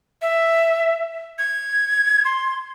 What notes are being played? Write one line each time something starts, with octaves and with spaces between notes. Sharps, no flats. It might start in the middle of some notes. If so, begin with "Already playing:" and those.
E5
G#6
C6